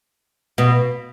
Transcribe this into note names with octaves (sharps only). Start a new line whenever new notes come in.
B2